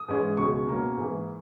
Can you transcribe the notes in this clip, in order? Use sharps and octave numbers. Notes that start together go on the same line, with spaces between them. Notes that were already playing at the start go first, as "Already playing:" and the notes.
Already playing: D#6
G#2 E3 G#3 C#4
C#2 B2 G#3 C#4 C#6
B2 A#3 C#4
G#2 E3 A#3